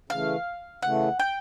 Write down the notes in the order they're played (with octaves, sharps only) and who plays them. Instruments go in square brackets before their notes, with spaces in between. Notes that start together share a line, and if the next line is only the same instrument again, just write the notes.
[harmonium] C#3 E3 A3 [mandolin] F5
[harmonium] C#3 E3 A3 [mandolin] F#5
[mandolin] G5